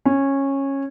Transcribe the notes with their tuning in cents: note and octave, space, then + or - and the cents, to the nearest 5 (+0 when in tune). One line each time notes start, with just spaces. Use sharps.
C#4 -15